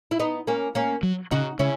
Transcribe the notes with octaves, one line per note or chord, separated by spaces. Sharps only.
E4
B3 D#4
A#3 C#4
A#3 C#4
F#3
C#3 D#4 F#4
C#3 C#4 E4